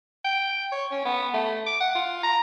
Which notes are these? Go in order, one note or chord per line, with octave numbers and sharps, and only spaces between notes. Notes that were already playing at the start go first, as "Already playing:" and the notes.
G5
C#5
C#4
B3
A3
D6
F#5
F4
A#5